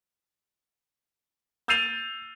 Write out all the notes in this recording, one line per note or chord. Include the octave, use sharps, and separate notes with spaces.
E6 G6 A6 C7 D#7 F7